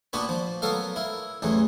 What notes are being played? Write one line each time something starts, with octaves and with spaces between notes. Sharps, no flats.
A#2 B3 D4 F#4 B4
F3
F#3 B3 A4 A#4 F5
E4 A#4
A1 E2 E3 F#3